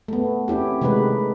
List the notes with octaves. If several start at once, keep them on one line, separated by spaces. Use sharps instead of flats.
A3 B3
C4 C#4 E4 G4
C3 D#3 G#3 A3 D#4 B4